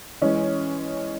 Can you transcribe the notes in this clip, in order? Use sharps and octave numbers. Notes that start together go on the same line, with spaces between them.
E3 G#3 C#4